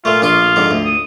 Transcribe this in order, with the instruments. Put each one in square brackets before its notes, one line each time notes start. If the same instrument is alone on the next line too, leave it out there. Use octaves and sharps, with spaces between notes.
[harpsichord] A#2 A3 [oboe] F4
[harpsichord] A#1 D4 C6 [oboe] F4
[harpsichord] F2 G#2 D3
D2
[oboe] D#6